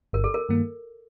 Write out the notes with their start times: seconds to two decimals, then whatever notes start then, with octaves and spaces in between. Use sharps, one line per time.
0.13 G1 A#4
0.24 A4
0.34 A#4
0.49 G2 D#3 A#3